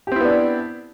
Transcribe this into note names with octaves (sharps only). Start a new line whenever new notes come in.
B3 C4 D4 E4 G4